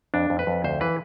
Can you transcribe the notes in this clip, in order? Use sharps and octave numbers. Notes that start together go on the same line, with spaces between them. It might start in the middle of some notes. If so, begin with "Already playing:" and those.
F2 D4
F2
B4
F2
D2 C5
E3 B4